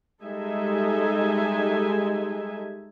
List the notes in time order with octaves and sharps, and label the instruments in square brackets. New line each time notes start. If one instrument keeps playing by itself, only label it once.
[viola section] G3 G#3 D#4 A4 E5 G#5